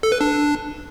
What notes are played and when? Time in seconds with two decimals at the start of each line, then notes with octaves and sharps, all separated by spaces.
0.03 A4
0.12 B4
0.21 D4